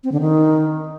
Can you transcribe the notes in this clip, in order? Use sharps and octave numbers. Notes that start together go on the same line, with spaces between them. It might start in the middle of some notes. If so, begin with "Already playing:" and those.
C4
D3
D#3